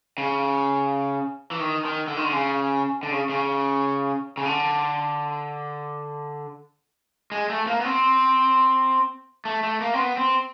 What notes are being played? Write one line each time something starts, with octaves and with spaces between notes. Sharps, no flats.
C#3
E3
D#3
D#3
D3
D#3
D3
C#3
D3
C#3
C#3
C#3
D3
G#3
A3
A#3
B3
C4
A3
A3
A#3
C4
B3
C4